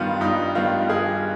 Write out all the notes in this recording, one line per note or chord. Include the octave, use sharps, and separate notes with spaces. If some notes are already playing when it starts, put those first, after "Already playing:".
Already playing: G2 D#3 G3 B3 F4
G2 D#4
D#3 G3 B3 F4
G2 G#4